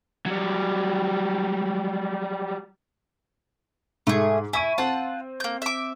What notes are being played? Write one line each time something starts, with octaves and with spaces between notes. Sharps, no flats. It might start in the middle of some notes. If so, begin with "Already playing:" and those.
F#3 G3
G#2 A3 G#4
E4 G#5 C#6 D#7
C4 F4 F#5 A5
A#3 G6
E5 D6